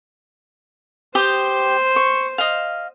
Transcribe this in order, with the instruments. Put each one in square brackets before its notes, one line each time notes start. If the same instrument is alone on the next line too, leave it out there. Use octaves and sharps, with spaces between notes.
[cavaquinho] G4 G5 D#6 [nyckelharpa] C5
[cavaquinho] C#6
D#5 F5